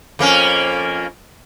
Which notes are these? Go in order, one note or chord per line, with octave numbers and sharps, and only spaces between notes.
F2 A#3 C#4